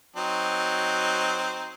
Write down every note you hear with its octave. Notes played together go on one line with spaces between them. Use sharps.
F#3 C4 D#4